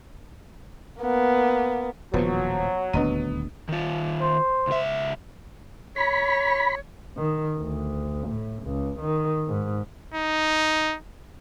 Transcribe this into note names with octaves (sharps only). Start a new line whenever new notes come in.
A#3 B3
D#1 D#2 A2 F3 F#3 B3 B4
D#1 D2 B3 D4 D#5 A#5 D#7
D#3 F4
C5
C#2 E5
C#5 B5
D#3
D2
A2
C#2
D#3
G#2
D#4